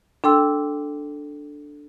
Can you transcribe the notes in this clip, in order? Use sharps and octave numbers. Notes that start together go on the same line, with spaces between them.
D4 A4 G5 C6 E6